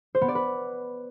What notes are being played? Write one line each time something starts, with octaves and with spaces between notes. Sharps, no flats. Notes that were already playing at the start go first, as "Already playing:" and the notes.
C5
B3
D5
B4